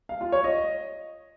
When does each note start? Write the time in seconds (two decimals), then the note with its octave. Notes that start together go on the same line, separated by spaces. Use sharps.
0.09 F5
0.21 F4
0.32 C#5
0.44 D#5